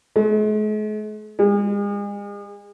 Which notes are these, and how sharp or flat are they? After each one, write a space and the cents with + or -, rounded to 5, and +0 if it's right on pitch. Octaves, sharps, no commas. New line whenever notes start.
G#3 +45
G#3 -40